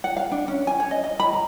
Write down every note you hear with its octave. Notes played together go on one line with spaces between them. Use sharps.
F#5
F5
D4
C#4
G#5
C#5
D#5
D#5
B5
A#5